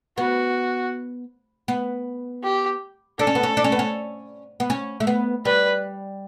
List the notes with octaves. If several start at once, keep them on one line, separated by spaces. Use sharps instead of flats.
B3 F#4
B3
G4
D4 A4
C#4
B3
C#4
D4
C#4
B3
C#4
B3
C#4
A3
B3
G3 B4